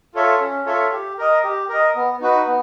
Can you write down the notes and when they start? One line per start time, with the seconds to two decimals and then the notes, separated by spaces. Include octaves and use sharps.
0.14 F4 A4 C#5 E5
0.40 C#4
0.66 F4 A4 C#5 E5
0.92 G4
1.18 A#4 D#5
1.44 G4
1.69 A#4 D#5
1.95 B3
2.21 D#4 F#4 B4
2.47 B3